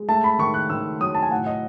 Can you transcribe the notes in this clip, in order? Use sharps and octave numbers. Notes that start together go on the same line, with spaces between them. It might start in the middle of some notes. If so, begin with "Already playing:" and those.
Already playing: G#3
A3 A5
B5
D#3 C#6
F#6
D#3 E6
F#3 D#6
A5
G#5
A2 F#5
D#5